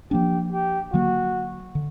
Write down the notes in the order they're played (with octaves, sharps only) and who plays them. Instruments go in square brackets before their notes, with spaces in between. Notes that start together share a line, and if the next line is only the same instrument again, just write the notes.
[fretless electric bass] F3 A#3 D4 [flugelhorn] G4
[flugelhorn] G4
[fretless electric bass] D3 F#3 A#3 [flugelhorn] F#4
[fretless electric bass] D3